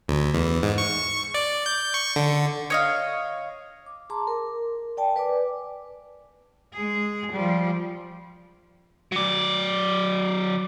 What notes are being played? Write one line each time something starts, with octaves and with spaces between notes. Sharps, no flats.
D2
E2
G#2
C#6
D5
G6
C#6
D3
C#5 D#5 F5
D6
G#4 A5 A#5 C6 D6
A#4
D5 G5 A5
B4 D5 G#5 D6
G#3 G#4
F3 G3
F#3 D5